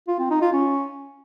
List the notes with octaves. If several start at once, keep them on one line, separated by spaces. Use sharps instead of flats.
F4
C4
D#4
F4
C#4